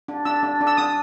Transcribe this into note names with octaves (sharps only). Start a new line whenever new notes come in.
D4
D4 E6
D4
D4
E6
D4 D#6